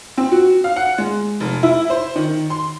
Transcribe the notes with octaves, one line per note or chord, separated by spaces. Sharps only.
C4
F#4
F5
F#5
G#3
F1
E4
C5
D#3
C6